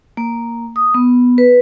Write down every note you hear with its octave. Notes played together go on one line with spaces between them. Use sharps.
A#3
D#6
B3
B4